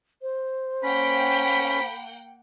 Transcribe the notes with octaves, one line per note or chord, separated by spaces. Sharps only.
C5
A#3 C#4 F#5 G5 B5